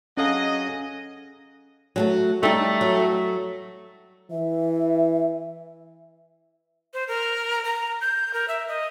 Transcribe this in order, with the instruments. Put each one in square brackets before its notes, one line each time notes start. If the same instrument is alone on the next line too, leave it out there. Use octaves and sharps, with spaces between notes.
[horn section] F#3 G#4 D#5 [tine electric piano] C#4 A4 F5
[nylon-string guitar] F#3 G#3 A3
[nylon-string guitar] G3 D#4 [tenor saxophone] A3
[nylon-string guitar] F#3
[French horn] E3 [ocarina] E5
[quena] C5
A#4
A#5
G6
A#4
E5
D#5